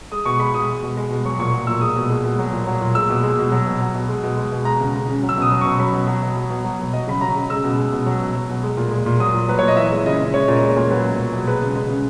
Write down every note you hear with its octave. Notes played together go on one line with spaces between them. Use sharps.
G#3 D#6
B2 C#6
G#3 B5
B2 D#6
G#3
B2
G#3
B2
F#3 C#6
A#2 C#6
F#3
A#2 E6
G#3 D#6
B2
G#3
B2
F#3
A#2
F#3
A#2
G#3 E6
B2
G#3
B2
F#3
B2
F#3
B2
G#3
B2
G#3
B2
G#3 A#5
C#3
G#3
C#3
F#3
E6
B2 D#6
F#3
B2 C#6
F#3 B5
B2
F#3
B2
F#3
B2
F#3
B2
F#3 D#5
C#3 B5
F#3 A#5
C#3
G#3 E6
B2
G#3
B2
F#3
B2
F#3
B2
G#3
A#2
G#3
A#2
F#3 D#6
A#2
F#3 B4
A#2 C#5
D#5
E3 E5
G#3
C#3 D#5
C#3
G#3 C#5
A#2
G#3
A#2
F#3 B4
B2
F#3
B2
G#3 B4
C#3
G#3
C#3